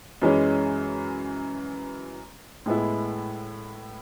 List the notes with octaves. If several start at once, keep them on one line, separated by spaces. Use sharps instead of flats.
F#2 E3 G#3 C#4
A2 G#3 B3 E4